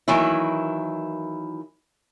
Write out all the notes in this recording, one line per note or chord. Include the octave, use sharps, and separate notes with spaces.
D#3 E3 F#3 A#3 E4